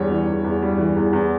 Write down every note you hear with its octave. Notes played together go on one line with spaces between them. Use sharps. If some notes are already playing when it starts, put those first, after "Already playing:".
Already playing: E2 G3 C#5
E3
E2
E2
G3
E3
E2
E2